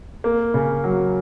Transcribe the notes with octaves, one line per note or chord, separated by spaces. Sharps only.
A#3
C#3
F#3